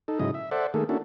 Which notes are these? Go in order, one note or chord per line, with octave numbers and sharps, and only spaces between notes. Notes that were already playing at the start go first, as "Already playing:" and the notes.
D#4 A4
G#2 C#3 F#3 E4 D#5
E5
A4 C5 D5 E5 F#5
D#3 A3 A#3 G#4 A4
A#3 C#4 D4 E4 F#4 A4